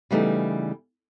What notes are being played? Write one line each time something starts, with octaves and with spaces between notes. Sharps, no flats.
C#3 E3 G3 A3 B3 D#4